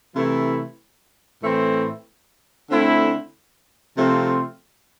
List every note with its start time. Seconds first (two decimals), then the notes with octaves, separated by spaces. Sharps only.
0.16 C3 E3 A3 E4
1.43 A2 E3 A3 C4 E4
2.70 D3 A3 C4 E4
3.97 C3 F3 A3 C4 F4